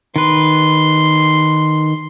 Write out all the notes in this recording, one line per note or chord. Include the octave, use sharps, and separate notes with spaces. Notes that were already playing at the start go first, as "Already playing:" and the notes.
D#3 B4 C6